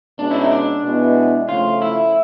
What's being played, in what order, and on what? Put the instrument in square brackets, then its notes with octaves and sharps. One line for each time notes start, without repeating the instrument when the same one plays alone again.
[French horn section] B2 G#3 C#4 [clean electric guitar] D4
[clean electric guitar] E4
D#4
D4
[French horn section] B2 G#3 B3 E4
[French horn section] C#3 F3 A3 [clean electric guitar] F4
[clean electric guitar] E4